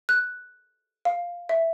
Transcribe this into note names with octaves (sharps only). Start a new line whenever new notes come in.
F#6
F5
E5